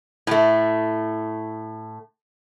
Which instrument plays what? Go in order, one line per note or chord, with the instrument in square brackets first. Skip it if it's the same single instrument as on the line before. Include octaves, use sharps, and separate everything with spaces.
[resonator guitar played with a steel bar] A2 A3